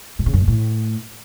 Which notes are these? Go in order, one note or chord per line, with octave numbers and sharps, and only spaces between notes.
A2
C#3
F#2
B2
A2